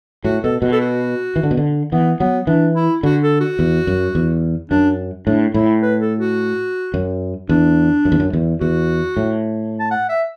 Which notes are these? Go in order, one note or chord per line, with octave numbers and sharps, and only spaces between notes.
A2 F#4
B2 A4
B2 F#4
A4
F#4
E3
D3
B2
D3
E3 B3
F#3 B3
E3 D4
E4
D3 F#4
A4
F#4
E2
F#2
E2
F#2 D4
A2 D4
A2 E4
B4
A4
F#4
F#2
E2 D4
F#2
E2
F#2
E2
E2 F#4
A2
A5
F#5
E5